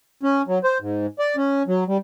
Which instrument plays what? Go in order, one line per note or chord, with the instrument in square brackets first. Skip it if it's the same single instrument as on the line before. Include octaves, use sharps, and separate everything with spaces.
[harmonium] C#4
F#3
C5
G#2
D5
C#4
F#3
G3